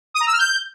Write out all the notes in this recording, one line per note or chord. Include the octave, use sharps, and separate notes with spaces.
D#6
A#5
E6
F6
G6